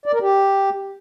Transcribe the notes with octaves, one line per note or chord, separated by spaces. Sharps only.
D5
A#4
G4